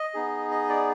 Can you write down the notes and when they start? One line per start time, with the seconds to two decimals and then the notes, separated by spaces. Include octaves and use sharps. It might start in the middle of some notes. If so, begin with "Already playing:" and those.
Already playing: D#5
0.14 B3 D#4 G#4
0.51 D#5
0.69 D5